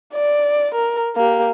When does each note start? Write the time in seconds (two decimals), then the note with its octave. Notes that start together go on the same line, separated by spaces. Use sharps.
0.14 D5
0.75 A#4
1.16 A#3 G4